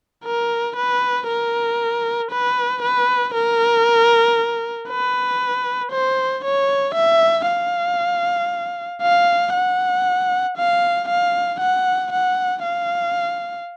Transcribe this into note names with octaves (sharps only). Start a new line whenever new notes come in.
A#4
B4
A#4
B4
B4
A#4
B4
C5
C#5
E5
F5
F5
F#5
F5
F5
F#5
F#5
F5